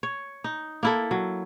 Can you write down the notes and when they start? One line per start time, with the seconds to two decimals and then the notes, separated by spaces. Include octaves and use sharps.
0.03 C#5
0.44 D#4
0.83 A#3 E4 A4
1.11 F#3